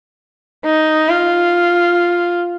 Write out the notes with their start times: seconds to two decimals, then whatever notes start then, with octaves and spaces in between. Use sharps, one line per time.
0.66 D#4
1.09 F4